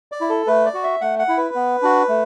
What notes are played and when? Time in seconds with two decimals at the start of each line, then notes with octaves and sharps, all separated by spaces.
0.12 D5
0.21 E4
0.30 A4
0.47 A3 B4
0.66 D5
0.74 F#4
0.84 E5
1.01 A3 F#5
1.19 F#5
1.28 E4
1.37 B4
1.55 B3
1.82 D4 F#4
2.09 A3